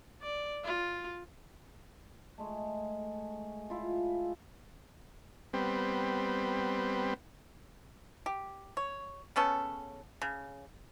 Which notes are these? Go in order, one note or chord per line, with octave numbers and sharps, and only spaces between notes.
D5
F4
G#3 A3
E4 F4
G3 B3 C4
G4
C#5
C#3 B3 C#4 A4
C#3